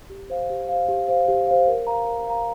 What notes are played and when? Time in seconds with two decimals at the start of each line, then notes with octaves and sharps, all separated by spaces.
0.10 G4
0.30 C5 F5
0.50 G4
0.69 C5 F5
0.88 G4
1.08 C5 F5
1.28 G4
1.48 C5 F5
1.68 A#4
1.87 F5 A#5
2.06 A#4
2.27 F5 A#5